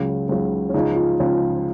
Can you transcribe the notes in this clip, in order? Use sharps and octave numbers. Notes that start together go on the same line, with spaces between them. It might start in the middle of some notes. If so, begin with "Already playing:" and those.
Already playing: C#2 C#3 F#3
C#2 C#3 F#3
C#4
C#2 C#3 F3 D#4
F4
C#2 C#3 F3